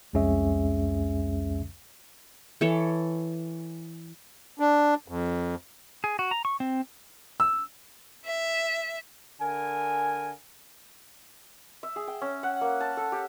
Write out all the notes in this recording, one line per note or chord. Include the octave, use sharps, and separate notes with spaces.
C2 F2 G#3 C#4 G#4 E5
E3 A4 C#5
D4
F2
G#4
F#4
A#5
C#6
C4
E6
E5
D3 A#4 G#5
E5
G#4
G5
C#4
F#5
A#3
A5
A4
G4